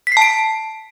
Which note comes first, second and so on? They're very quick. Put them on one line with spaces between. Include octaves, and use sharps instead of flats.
B6 C7 A5 D7